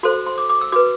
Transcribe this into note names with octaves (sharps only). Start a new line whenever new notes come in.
F#4 A4 C5 C6
C6
D6
D6
E6
F#4 B4 D6